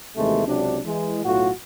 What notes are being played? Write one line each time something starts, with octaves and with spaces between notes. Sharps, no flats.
D#2 C3 E3 G#3 A3
C#2 C3 F#3 D4
E3 G#3
B1 A2 F4 F#4